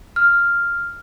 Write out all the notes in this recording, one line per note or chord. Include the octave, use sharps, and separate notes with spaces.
F6